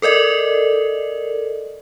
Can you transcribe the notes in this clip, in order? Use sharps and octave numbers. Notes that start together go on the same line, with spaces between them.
A4 A#4 D5 D#5